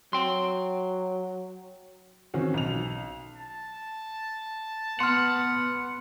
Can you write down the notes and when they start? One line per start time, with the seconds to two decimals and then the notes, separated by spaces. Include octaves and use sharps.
0.13 F#3 G5 C6
2.34 D#3 E3 C4 C#4 F#4
2.54 B1 F7
3.37 A5
5.00 B3 F#5 C6 F6